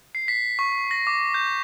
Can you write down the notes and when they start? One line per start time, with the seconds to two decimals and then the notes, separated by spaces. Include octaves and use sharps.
0.15 C7
0.28 B6
0.59 C#6
0.91 A#6
1.07 D6
1.34 G6